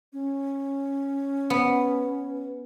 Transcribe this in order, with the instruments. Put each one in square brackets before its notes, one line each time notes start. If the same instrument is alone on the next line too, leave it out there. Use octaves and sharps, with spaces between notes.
[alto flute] C#4
[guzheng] B3